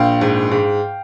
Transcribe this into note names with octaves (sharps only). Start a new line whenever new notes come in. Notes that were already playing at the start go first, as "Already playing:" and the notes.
Already playing: A#1 F5 G5
G#2
G#2